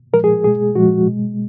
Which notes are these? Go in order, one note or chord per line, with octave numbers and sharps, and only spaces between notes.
A#2 F3 G#3 A#4
G#4
B2 G#3 G#4
A#2 F3 G#3 F#4
B2 G#3